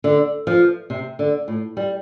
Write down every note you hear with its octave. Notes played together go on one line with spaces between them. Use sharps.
D3
F3
C3
D3
A2
G3